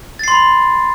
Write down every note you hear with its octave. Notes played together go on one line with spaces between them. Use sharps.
B5 C6 A6 C7